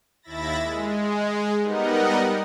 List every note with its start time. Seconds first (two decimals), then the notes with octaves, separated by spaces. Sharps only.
0.22 D#2 E4 E5 B5 A6 A#6
0.63 G#3
1.61 G3 B3 D#4 A#4 D#5 F#5